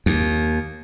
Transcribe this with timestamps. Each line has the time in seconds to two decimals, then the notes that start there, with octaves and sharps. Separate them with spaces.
0.06 D#2